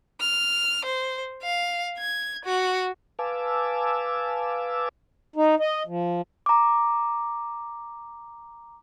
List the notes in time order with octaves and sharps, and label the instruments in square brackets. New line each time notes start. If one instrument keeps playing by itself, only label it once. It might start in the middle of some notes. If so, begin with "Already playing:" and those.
[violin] F6
C5
F5
G#6
F#4
[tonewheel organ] B4 F5 G#5 A5 D6 E6
[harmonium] D#4
D#5
F3
[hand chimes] A#5 D6